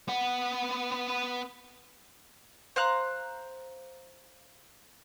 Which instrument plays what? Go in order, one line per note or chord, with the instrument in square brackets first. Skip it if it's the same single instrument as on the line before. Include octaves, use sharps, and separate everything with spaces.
[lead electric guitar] B3 F#5
[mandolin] C5 F5 A#5 F#6